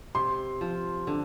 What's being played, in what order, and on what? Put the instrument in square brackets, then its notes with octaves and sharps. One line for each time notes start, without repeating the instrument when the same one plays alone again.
[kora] C3 [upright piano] C6
[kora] F3
D3